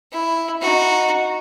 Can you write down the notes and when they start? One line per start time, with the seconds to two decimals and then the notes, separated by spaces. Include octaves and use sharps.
0.12 E4
0.61 D#4 F#4